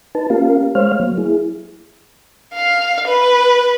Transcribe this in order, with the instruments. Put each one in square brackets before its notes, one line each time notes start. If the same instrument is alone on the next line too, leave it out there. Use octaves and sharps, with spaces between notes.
[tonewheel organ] D#4 B4 A5
A#3 C#4 F4 G4 A#4 F5
G#3 C5 C#5 F5 F6
F#3 A#3
E4 G#4
[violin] F5
B4